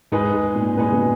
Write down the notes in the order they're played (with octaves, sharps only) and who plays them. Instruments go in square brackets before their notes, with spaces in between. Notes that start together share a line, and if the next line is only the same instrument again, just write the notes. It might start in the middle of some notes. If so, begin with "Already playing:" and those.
[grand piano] G#2 [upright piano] G#3 D#4 G#4 B4
[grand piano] G#2
A#2
[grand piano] A#2 [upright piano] G#3 D#4 G#4 B4
[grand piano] C#3
B2